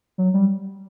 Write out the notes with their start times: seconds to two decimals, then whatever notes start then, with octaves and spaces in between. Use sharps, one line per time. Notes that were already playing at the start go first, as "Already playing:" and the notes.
0.18 F#3
0.34 G3